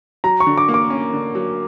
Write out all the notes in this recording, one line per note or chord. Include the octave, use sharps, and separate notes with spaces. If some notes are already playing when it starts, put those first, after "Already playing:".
F#3 A#5
C#6
D3
D6
A#3
D6
C#4
D3
F#3